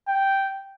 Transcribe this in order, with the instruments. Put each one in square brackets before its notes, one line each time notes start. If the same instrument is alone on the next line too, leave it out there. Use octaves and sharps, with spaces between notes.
[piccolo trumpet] G5